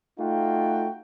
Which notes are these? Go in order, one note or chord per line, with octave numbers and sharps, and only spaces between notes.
A3 D#4 F4 F#4 G5